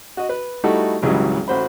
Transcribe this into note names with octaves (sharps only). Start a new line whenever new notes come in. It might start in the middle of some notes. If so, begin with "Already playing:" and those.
F#4 D#5
B4
G3 A3 D#4 E4 F#4 A4
G#1 C#2 C#3 E3 F#3 G3
A1 F#4 C5 B5